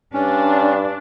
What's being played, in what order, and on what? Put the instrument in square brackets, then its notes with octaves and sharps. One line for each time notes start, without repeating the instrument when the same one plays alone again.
[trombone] G2 [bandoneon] C#4 [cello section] D4